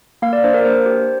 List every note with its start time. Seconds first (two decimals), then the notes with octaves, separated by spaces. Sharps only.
0.22 A#3 F5
0.33 D5
0.44 D4 C5
0.54 A#4
0.65 A#3 C5
0.86 G4